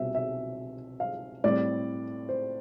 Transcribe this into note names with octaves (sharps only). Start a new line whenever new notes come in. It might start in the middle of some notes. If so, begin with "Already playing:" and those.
Already playing: C2 B2 G3 C4 E5
E5
F5
A2 G3 C4 D5
C5